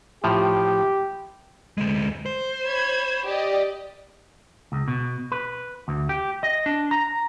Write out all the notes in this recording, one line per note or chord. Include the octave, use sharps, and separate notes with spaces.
A2 F3 G4
D2 G#3
C5
C#5 B5 G#6
G4 D5 D#5
C#2
B2
B4
D2
G4
D#5
D4
A#5